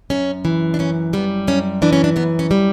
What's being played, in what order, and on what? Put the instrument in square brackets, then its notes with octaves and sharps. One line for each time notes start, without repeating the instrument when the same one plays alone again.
[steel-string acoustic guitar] F#2 C#4
E3
D4
F#2 C#4
G3 B3
F#2 C#4
E3 D4
C#4
D4
F#2 B3
C#4
G3